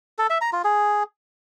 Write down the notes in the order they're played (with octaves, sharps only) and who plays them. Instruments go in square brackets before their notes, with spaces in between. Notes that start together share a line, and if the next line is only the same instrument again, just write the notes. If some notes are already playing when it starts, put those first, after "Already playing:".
[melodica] A4
E5
A#5
F4
G#4